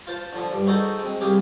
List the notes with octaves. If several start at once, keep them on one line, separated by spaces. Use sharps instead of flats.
F4 C5 A5
D3 F3
G2
D#4 F#4 G#4 A4 C5
G#3 C4
C2 G4 G#4 F5